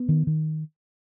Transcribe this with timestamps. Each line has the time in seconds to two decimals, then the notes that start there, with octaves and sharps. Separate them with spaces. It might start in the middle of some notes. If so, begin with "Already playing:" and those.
Already playing: B3
0.09 D#3
0.27 D#3